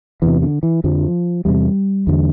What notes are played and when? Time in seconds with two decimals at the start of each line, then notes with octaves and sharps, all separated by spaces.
0.22 E2 C3 E3
0.42 D3
0.63 E3
0.84 F2 D3 F3
1.45 E2 C3 G3
2.07 E2 D3